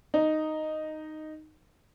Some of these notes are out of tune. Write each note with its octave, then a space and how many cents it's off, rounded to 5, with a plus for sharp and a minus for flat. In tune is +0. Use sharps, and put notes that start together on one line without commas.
D#4 -5